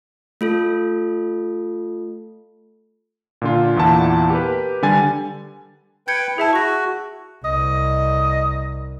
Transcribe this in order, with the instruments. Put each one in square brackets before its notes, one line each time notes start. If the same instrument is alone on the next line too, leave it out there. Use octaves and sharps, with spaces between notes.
[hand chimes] A3 F4 A4
[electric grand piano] A#2 D3 F4
E2 A#2 E4 F#5 A5
G4 A#4 B4
D3 G3 G#5 A6
[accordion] B4 G5 [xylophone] G6 G#6 C#7
[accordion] E4 [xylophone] G#4 E5 A5
[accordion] F#4 [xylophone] C#6 A#6
[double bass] C2 [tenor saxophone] D#5